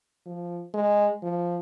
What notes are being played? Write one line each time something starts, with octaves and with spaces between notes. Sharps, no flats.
F3
G#3
F3